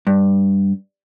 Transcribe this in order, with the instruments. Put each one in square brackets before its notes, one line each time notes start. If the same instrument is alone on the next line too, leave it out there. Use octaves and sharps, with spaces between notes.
[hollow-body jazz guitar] G2